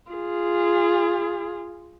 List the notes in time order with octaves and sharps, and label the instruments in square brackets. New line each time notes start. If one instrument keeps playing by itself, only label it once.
[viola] F4 G#4